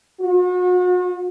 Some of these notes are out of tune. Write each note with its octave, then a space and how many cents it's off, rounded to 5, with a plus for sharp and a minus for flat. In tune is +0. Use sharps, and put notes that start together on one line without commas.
F#4 -40